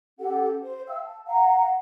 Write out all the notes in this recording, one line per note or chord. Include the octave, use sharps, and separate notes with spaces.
C#4 G4 A4 F#5
C5
E5 F5 G5 E6
A5
F5 F#5 A#5